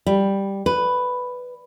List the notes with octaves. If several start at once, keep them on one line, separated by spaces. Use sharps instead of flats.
G3
B4